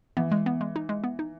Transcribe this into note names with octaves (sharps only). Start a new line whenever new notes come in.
E3 B3
G#3
B3
G#3
D#4
G#3
B3
D#4